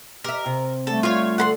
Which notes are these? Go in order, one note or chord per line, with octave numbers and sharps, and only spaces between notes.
G4 A#4 E5
C3
D3 G3 A3 A4
F4 C#5 F5
D2 A4 F#5 B5 C6